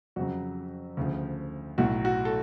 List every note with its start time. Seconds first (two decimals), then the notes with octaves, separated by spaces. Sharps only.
0.16 F2 C#3 F#3 F#4
0.97 D2 C#3 F3
1.78 B1 A2 F#3 F#4
2.05 F#4
2.25 A4